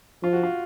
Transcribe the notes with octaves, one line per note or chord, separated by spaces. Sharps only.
F3 F4
F#4
F4